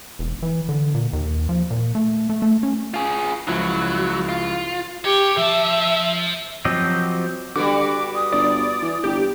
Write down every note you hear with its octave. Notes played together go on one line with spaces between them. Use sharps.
E1
E3
D3
A#2
D#2
F3
A#2
A3
A3
A3
C#4
F4 G#4
C#2 F3 F#3 E4
F4
G4 C#5
F3 E5 A5
F3 F#3 C4 G4 D#5
D3 G3 B3 F#4 D6
D#6
G1 D5
E3
G1 G4